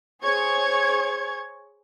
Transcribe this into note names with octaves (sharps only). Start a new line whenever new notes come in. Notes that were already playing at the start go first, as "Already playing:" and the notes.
G#4 C5 C#5 C#6 G#6